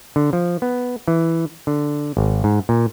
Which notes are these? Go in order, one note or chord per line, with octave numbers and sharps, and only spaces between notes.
D3
F3
B3
E3
D3
G#1
G#2
A#2